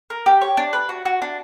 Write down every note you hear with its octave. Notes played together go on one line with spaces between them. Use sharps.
A#4
G4
C#5
D4
B4
F#4
F#4
D4